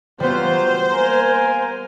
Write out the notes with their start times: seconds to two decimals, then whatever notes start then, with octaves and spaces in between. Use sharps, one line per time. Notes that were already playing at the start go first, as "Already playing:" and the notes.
0.20 F#3 G3 B3 F4 C5
0.90 A#3 A#4 G#5